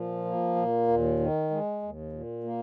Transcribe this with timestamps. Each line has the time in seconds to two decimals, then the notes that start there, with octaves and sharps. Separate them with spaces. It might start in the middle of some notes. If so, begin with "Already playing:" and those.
Already playing: A#2 F3
0.25 A#3
0.56 A#2
0.88 D#2
1.20 D#3
1.51 G#3
1.82 D#2
2.12 A#2
2.44 A#3